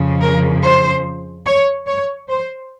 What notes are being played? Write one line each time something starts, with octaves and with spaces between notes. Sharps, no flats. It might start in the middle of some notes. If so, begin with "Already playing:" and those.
Already playing: F2 C#3 F3
A#4
C5
C#5
C#5
C5